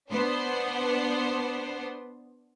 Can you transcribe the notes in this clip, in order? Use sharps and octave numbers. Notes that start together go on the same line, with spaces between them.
B3 D4 C5